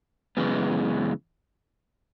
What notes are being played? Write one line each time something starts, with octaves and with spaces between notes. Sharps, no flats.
F#2 C#3 E3 G#3 B3